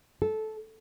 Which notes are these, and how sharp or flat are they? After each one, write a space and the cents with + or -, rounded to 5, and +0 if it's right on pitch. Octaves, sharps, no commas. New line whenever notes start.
A4 -15